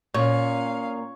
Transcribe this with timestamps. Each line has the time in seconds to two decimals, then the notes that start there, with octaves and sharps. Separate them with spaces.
0.14 A#2 C#4 C#5 F5